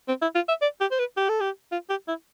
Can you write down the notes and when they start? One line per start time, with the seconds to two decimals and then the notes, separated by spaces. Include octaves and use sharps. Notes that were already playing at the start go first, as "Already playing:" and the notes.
0.08 C4
0.22 E4
0.35 F4
0.48 E5
0.62 D5
0.80 G4
0.92 C5
0.99 B4
1.17 G4
1.29 A4
1.41 G4
1.72 F4
1.90 G4
2.08 E4